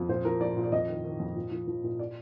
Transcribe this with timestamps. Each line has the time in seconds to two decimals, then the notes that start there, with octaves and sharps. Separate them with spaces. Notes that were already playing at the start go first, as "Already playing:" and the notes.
Already playing: F2
0.09 A#2 C5
0.25 F3 A#4
0.41 F3 D5
0.57 A#2
0.64 D5
0.72 F2 D#5
0.88 D#3
1.04 D#3
1.20 F2
1.35 A#2
1.52 F3
1.67 F3
1.84 A#2
1.99 D5